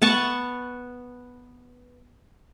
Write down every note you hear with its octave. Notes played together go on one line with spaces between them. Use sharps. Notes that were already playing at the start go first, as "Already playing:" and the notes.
B3 F#5 A5 C#6